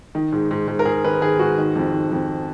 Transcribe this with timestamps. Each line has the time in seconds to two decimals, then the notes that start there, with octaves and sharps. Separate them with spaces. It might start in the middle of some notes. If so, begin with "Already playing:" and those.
0.15 D#3
0.32 G#2
0.51 G#2
0.68 G#2
0.79 A#4
0.85 G#2 G#4
1.05 D#3 B4
1.21 D#3 G#4
1.39 G#2 F#4
1.58 D#3
1.76 F2
1.93 D#3
2.12 F2